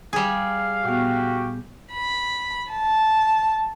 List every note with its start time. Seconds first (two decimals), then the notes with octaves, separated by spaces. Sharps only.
0.13 G3 G#4 F5
0.84 A#2 B3 F#4 G4
1.92 B5
2.70 A5